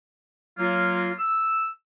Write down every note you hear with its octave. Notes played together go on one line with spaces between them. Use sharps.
F#3 A#3 F4
E6